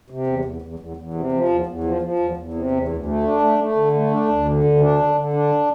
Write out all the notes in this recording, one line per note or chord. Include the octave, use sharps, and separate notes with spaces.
C3
E2
E2
E2
E2
E2
C3
F3
E2
E2
F3
F3
E2
E2
C3
E2
D2
A3
D4
A3
A3
D3
A3
D4
D2
D3
D2
D4
D3
D3
D4